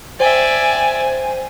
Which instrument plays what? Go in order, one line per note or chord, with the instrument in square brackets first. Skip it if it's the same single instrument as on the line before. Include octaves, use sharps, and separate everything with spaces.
[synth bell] C5 G5 [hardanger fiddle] D5 E5 [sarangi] G#5